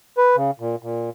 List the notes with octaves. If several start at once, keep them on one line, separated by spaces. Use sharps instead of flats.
B4
C#3
A#2
A#2